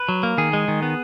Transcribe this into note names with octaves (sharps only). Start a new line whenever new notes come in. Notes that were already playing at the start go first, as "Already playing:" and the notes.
Already playing: B4
F#3
A#3
D#3 G#4
G#3
D#3
B3